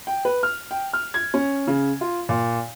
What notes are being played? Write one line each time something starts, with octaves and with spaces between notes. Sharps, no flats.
G5
B4
F6
G5
F6
G#6
C#4
C#3
F4
A#2